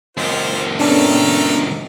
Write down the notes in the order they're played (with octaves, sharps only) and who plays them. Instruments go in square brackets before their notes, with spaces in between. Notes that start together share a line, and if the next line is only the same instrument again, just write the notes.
[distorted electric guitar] C#2 F#2 [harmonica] F4 C5
[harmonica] A3 A4 A#4 [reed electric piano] B3 C#4 D4